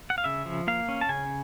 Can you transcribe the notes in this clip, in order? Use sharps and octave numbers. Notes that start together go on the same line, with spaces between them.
F#5
F5
C#3 E5
F3
A#3 F5
C#4
A5
C#3 G#5